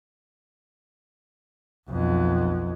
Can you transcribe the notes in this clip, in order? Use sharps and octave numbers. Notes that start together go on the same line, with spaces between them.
B1 F2